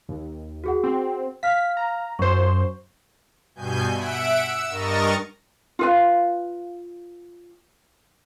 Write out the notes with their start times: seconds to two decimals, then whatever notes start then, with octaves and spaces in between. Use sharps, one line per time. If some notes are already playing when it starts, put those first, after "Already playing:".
0.09 D#2
0.64 F#4 G#4 F#5
0.84 C4
1.43 F5 F6 B6
1.77 A#5
2.19 F#2 C5 C#6
3.55 G2 B2 G#5 G6
3.95 E5 F#5 D7
4.39 E6
4.69 G2 A#4 D#5 A#5 C#6 A6
5.79 F4 B4 F5